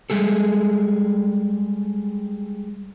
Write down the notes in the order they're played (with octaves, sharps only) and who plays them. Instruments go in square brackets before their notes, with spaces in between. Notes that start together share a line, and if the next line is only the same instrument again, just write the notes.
[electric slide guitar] G3 G#3 G#4 A4